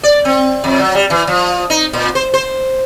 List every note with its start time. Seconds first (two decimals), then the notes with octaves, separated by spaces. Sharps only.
0.03 D5
0.25 C4
0.64 F2
0.79 F#3
0.95 G3
1.10 E3
1.27 F3
1.70 D#4
1.93 A#2
2.15 C5
2.34 C5